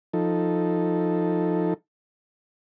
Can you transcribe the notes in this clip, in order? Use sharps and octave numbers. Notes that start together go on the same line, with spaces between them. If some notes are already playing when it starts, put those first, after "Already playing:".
F3 D#4 A4